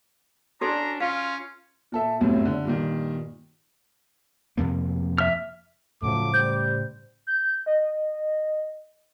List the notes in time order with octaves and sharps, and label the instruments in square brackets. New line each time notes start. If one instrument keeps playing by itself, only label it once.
[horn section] C#4 D4 [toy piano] F#4 A4 D5 [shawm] A#5
[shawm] C#4 [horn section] F4 [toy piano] F5
[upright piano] A#2 A4 E5
G1 C2 F#2 A2
D3
G2 A#2 D#3
[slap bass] F2 C3 A#3
[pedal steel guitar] E5 F6
[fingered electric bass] A2 C#3 [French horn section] F3 F#3 A3 [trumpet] D6
[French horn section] G3 C5 [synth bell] G6
[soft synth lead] G6
D#5